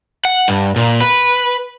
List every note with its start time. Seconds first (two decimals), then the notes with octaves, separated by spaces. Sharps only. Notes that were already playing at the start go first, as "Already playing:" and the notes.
0.25 F#5
0.48 G2
0.76 A#2
1.01 B4